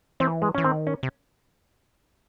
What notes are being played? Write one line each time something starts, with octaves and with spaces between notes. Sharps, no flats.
E3 C4
G#3
E3 C#4
D#3 C4
C#4
C3